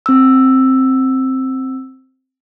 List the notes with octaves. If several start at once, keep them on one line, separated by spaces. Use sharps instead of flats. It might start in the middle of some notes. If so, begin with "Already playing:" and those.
C4 E6